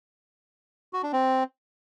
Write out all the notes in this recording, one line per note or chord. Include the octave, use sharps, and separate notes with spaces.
F#4
D4
C4